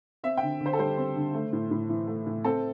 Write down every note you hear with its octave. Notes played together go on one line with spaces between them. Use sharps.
C4 E5
G5
D3
D3 C5
A4
G3 C5
C4
D3
A3
A2
A2
E3
A3
A2
C4 A4